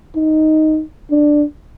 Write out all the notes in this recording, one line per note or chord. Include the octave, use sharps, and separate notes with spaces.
D#4
D4